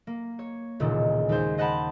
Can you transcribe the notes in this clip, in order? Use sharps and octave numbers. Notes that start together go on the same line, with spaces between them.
A#3
C#5
E1 C#2 A#2 D#3
D#2 G#3 C5
C5 D#5 F#5 G5 A5 B5